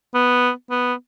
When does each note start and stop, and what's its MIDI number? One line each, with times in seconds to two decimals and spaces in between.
0.14 0.51 59
0.70 0.94 59